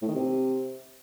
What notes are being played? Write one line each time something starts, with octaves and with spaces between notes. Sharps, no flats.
A2
D#3
C3